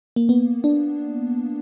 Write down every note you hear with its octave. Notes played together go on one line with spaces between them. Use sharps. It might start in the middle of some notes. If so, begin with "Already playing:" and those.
A#3
B3
D4